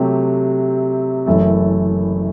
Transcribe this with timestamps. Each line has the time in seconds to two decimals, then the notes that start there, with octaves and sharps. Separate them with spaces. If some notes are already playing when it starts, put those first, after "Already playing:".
Already playing: C3 F#3 A3 C4 G4
1.26 F#1 F#2 E3 A3